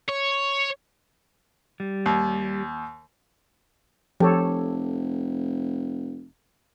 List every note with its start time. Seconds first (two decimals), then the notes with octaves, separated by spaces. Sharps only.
0.09 C#5
1.80 G3
2.06 D#2
4.20 F1 F3 G4 A4 C#5